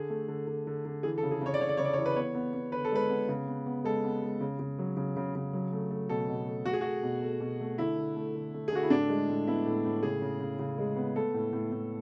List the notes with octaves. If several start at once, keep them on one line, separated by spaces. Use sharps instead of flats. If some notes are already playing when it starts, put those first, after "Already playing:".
Already playing: D3 G#4
A3
D3
D3
D3
D3
E3 G#4
A4
C#3
G#4
C#3 C#5
D5
C#3 C#5
D5
C#3 C#5
D5
C#5
E3
B4
B3 C#5
B3
B3
D3 B4
A4
G#3 B4
B3
C#3
B3
B3
G#3 A4
B3
G#3
C#3
C#3
F#3
C#3
C#3
C#3
F#3
A3
A3
B2 A4
B2
A3
A3 F#4
G#4
A3 F#4
B2
A3
B2
A3
D3 E4
D3
A3
D3
A3
G#4
D3 F#4
E4
A2 D4
G#3
A2
B3 E4
A2
A2
C#3 G#4
C#3
C#3
C#3
G#3
B3
A3 A4
A2
A2
A2